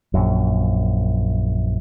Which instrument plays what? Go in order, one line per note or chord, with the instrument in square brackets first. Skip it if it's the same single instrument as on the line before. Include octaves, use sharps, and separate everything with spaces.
[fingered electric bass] A#1 F#2